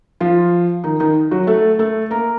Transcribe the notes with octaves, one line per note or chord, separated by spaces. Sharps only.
F3 F4
D#3 D#4
D#3 D#4
F#3 F#4
A3 A4
A3 A4
A#3 A#4